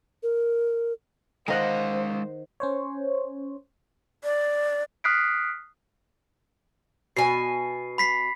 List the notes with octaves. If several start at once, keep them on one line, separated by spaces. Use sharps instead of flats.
A#4
D#3 G#3 C5 D#5 F5 F#5
C#4 C5 C#5
D5
D#6 F6 F#6 B6 C7 D7
B2 G#5 C7
B5 B6 C7